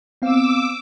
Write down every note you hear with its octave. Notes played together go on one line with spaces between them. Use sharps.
B3 C4 F5 D6 E6